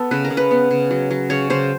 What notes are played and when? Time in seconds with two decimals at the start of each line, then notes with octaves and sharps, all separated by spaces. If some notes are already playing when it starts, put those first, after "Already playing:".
Already playing: B3 A4
0.11 C#3 B4
0.25 A#4
0.30 C#3
0.37 B4
0.51 B3
0.71 C#3
0.91 F#3
1.11 F#3
1.30 C#3 C#5
1.50 C#3 C5